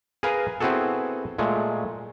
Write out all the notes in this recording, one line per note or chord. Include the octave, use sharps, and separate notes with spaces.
G#4 A#4 B4 F5 G#5 A#5
B3 C4 E4 F#4 G#4 A4
A#2 G#3 A3